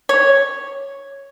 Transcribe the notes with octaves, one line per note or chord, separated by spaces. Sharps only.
C#5